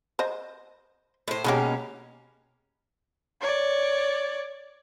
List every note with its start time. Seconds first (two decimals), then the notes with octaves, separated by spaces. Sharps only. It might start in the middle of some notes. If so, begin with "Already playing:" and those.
0.19 C5 D#5
1.28 A2 C5
1.44 B2 D#3 G#3 A#3 C#4 G4
3.41 C#5 D5